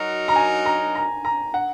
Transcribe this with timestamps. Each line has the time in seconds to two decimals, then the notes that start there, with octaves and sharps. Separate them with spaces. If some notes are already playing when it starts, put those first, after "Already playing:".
Already playing: F#3 D#4 F#4 A#4
0.28 A#5
0.36 G#5
0.65 A#5
0.95 A#5
1.25 A#5
1.54 F#5